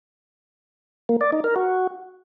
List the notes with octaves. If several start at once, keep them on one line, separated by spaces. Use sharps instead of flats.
A#3
D5
D#4
A#4
F#4